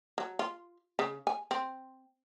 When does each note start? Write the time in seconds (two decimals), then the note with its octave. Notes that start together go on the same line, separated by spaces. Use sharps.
0.18 F#3
0.39 F4
0.99 C#3
1.27 G#5
1.51 C4